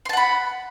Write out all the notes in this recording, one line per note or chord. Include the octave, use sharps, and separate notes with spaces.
F#5 A5 B5 C6